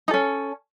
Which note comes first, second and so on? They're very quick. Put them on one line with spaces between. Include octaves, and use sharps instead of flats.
D#4 A4 C#4